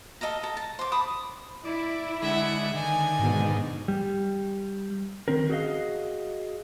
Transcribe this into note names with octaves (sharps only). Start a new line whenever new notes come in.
A4 D#5 F5 A#5
A4 A#5
A5
C5 D6
A5 B5 D6 D#6
E4 D5
D3 G#3 E5 F#5
D3 D#3 G#5
G#2 B2
G3
D#3 C4 C#4 A#4
F#4 G#4 C#5 D#5 F5